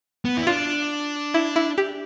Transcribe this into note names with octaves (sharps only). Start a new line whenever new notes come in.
B3
E4
D4 F4
E4
E4
G4